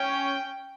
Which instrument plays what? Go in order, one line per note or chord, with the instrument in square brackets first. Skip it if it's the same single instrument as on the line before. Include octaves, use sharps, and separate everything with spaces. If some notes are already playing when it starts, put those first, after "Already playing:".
Already playing: [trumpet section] C#4 [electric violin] G5